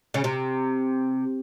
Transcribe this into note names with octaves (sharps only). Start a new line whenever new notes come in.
C#3
C3